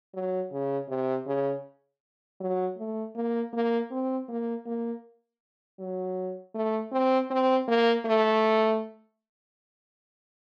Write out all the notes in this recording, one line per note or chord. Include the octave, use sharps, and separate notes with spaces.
F#3
C#3
C3
C#3
F#3
A3
A#3
A#3
C4
A#3
A#3
F#3
A3
C4
C4
A#3
A3